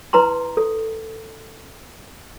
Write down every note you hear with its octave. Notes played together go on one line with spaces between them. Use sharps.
E4 B4 A#5 C6
A4